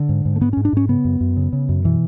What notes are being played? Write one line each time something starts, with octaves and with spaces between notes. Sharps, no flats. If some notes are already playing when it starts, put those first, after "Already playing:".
Already playing: D3
G#2
G#2
A3
G#2 B3
G#2 C#4
D4
G#2 C#4
C#3 B3
F#2
F#2
C#3
C#3
F#2
B2 E3